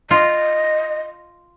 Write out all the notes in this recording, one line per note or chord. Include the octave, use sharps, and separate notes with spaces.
F4 D#5